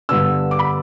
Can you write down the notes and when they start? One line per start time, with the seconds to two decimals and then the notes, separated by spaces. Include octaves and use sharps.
0.09 G2 D3 B3 D4 E6
0.51 D6
0.59 B5